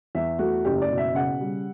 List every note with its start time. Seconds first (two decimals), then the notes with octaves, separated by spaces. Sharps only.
0.15 E2 E5
0.39 A3 F#4
0.65 F#1 G4
0.82 D5
0.90 B2
0.98 E5
1.15 C#3 F#5
1.41 G3